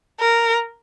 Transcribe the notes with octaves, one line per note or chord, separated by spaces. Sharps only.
A#4